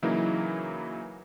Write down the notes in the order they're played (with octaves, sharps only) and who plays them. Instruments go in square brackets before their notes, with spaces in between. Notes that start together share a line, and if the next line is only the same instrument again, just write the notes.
[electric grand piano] C#3 E3 F#3 A#3 D#4 E4